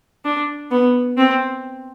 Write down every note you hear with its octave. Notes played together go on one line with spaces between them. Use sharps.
D4
B3
C4